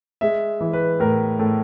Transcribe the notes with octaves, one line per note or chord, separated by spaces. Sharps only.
G#3 E5
E3
B4
A2 A#4
A2 A4